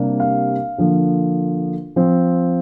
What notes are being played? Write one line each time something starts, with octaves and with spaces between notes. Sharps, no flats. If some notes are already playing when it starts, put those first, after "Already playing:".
Already playing: C3 G3 A#3 D4
F5
D3 F3 A#3
F3 C4